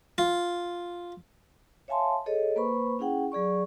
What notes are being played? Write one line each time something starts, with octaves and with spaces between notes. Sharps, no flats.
F4
C#5 E5 F5 G#5 A5 C6
G#4 A4 C#5 D#5
A#3 B4 C5 B5 C#6
C#4 E4 G#4 F#5 G5
F#3 G#4 D5 C#6